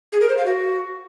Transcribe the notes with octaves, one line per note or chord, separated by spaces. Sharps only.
G#4
A#4
C5
F5
F#4